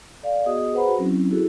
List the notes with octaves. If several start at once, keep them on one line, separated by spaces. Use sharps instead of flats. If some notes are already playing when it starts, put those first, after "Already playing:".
A4 D5 F5
B3 F#4 G#4 D#5 D#6
G#4 B4 C5 F#5 A#5 B5
F#4
F#3 C4 C#4 E4
E4 F#4 G#4 A4